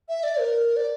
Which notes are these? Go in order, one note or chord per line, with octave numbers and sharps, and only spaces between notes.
E5
D5
A#4
D5